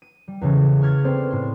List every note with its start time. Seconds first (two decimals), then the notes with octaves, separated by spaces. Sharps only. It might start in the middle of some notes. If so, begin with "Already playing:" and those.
0.02 D#7
0.28 G3
0.41 E2 C#3 E3
0.82 C#6 F6 G#6 A6
1.04 B3 C4 A4 C5 D5
1.31 A2 C6